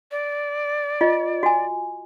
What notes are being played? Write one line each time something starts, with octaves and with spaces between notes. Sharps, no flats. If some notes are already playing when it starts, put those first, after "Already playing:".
D5
F4 D#5
F#4 G#5